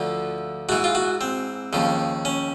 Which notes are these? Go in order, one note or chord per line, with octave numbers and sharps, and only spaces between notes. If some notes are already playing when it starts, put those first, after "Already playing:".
Already playing: D2 D3 F3 F4
G#2 E3 F#4
F4
F#4
C4
D#2 C#3 F3
C#4